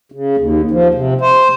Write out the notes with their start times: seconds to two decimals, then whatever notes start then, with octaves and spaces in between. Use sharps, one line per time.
0.12 C#3
0.37 D#2
0.71 F3
0.94 C3
1.21 C5